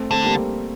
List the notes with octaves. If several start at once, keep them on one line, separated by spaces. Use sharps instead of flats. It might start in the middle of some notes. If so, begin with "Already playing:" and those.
Already playing: A3 C4
D3 A3 C4
G3 A#3